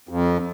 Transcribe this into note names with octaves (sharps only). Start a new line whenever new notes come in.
F2